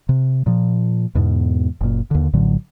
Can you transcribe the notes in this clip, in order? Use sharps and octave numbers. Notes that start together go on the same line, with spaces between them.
C3
A#2 F3
E2 G#2 B2
F#1 A#2
D#2 D3
A#1 A2 D3 F#3